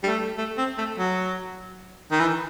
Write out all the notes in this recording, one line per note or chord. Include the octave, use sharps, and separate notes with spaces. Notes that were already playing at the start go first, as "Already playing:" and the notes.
G3
A3
A3
C4
A3
F#3
D#3
E3